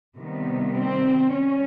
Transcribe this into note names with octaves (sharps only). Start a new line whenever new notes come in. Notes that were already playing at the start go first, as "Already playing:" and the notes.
C3 D#3 G3 B3
C4
G3 C#4